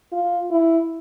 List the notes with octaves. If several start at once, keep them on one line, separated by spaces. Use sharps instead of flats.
F4
E4